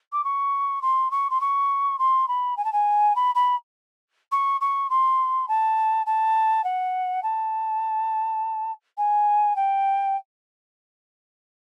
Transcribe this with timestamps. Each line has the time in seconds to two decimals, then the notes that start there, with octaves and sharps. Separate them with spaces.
0.12 D6
0.24 C#6
0.82 C6
1.11 C#6
1.30 C6
1.40 C#6
1.98 C6
2.28 B5
2.56 G#5
2.64 A5
2.72 G#5
3.15 B5
3.35 B5
4.31 C#6
4.60 C#6
4.89 C6
5.48 A5
6.06 A5
6.64 F#5
7.22 A5
8.97 G#5
9.55 G5